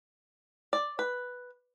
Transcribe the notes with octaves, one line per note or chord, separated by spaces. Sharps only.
D5
B4